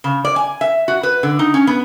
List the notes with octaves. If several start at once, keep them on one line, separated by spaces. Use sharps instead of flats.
C#3
D5
G#5
E5
F#4
B4
D3
D#4
C#4
B3